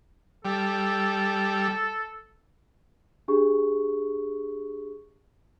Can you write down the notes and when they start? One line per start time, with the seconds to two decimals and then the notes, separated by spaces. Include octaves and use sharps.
0.45 G3 A4
3.28 D4 G4 G#4 C#6